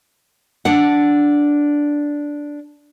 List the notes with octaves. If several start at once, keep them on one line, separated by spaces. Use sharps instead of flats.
D4 F#5